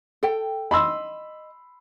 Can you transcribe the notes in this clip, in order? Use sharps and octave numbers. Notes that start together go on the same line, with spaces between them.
A4 G5
D#5 B5 C6 E6